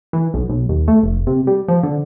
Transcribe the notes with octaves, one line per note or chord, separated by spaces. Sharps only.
E3
B1
B1
D#2
A3
F1
C3
G3
F3
D3